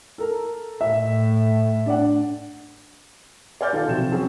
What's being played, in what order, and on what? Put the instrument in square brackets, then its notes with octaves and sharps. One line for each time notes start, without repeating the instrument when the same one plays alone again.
[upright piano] A4 A#4
[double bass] A2 [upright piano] E5
[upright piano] D4 D5 F#5
[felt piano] D5 G#5 F6 G6 A6
D#3 F4 A4
C3 F3 F#3 E7
F#3 C4 C#4 G#4